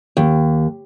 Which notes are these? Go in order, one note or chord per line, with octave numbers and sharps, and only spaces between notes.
D#2